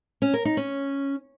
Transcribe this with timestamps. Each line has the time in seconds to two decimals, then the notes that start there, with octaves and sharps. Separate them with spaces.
0.22 C#4
0.34 A#4
0.45 D#4
0.57 C#4